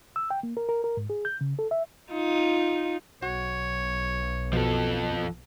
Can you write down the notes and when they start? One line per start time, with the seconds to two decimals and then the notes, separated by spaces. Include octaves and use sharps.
0.16 E6
0.30 G5
0.43 A#3
0.57 A#4
0.69 A#4
0.84 A#4
0.97 G#2
1.10 G#4
1.25 G6
1.41 C#3
1.59 A4
1.71 E5
2.12 D#4 F4
3.23 B1 F#4 C#5
4.53 B2 F3 A4